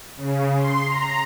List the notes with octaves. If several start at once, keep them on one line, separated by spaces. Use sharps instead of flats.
C#3
C6
A#5